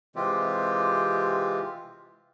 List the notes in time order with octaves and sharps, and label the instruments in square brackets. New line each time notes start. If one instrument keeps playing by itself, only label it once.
[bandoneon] C3 E3 G#3 C4 F4 G4